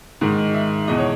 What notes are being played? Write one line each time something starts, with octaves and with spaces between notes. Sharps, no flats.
G#2 D#3 G#3
E5
E2 B2 G#3 D#5
C#5